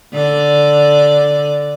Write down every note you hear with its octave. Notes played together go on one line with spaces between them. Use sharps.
D3 D5